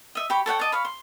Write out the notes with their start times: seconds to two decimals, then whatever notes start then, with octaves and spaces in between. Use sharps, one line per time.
0.15 D#5 E5
0.30 G4 C#5 B5
0.46 A4 C#5 F#5 G5
0.59 D5 D#5 A5
0.72 C#5 F5 B5
0.85 C6